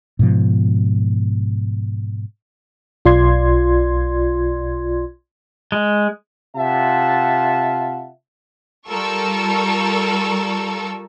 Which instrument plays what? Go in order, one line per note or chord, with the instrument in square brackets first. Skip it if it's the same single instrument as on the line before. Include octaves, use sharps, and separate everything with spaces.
[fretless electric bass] G#2 B2 F3
[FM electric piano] B1 F4 D5 C6 G#6
[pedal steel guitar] G#3
[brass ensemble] C3 F4 E5 F#5 A5
[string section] G3 F4 A4 A#4 C#6 E6